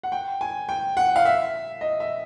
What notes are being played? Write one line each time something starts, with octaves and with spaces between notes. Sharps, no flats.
F#5
G5
G#5
G5
F#5
F5
E5
D#5
E5